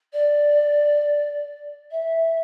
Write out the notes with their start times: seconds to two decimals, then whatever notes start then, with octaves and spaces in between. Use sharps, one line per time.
0.13 D5
1.91 E5